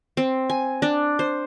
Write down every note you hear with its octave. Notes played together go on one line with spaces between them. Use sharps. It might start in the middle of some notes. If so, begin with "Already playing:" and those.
C4
G#5
D4
C5